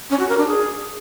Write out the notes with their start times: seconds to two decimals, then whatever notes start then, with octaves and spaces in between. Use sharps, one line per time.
0.10 C#4
0.19 F#4
0.29 A#4
0.38 D4
0.47 G#4